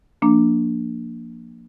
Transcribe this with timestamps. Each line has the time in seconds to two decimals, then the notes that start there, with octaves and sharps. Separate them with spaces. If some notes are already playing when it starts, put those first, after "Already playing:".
0.22 F3 A#3 D4